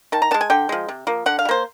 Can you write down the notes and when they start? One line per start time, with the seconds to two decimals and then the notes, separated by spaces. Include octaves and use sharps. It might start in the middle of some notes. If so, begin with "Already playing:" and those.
0.12 D#3 A5
0.22 A#5
0.31 G#3 B3 A5
0.41 G#5
0.50 D3 G5
0.69 F3 G#3
0.88 C3
1.07 F3 A#3
1.26 D3 F#5
1.39 F5
1.45 G3
1.49 A#3 C5